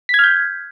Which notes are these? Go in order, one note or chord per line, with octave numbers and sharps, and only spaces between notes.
F6 G6 G#6 B6